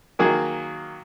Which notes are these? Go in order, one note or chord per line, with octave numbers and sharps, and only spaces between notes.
D#3 F#3 A#3 G#4